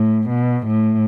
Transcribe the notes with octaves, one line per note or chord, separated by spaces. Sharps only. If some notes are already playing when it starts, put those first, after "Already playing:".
Already playing: A2
B2
A2